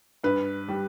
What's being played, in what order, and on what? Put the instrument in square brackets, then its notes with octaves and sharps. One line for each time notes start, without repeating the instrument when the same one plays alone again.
[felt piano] G2 B4
G3